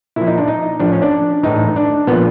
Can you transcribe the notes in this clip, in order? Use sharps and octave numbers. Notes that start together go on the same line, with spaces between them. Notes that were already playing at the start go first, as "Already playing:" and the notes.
A#2 F3 E4
D#4
D4
D#4
A2 F3 D4
C#4
D4
A2 E3 D#4
D4
A#2 F3 B3